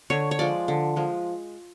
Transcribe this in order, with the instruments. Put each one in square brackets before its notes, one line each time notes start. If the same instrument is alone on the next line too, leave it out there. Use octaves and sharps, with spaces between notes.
[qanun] D3 C#5
C#5
F3 G#3 D5
D3
F3 G#3